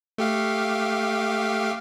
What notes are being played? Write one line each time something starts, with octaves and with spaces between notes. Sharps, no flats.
A3 G4 F5